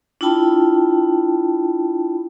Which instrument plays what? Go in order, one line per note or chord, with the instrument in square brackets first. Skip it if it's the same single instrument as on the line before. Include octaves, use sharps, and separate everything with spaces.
[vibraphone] D4 E4 F4 G5 A5 B5